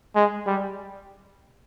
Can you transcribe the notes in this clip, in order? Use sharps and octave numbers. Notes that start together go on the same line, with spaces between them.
G#3
G3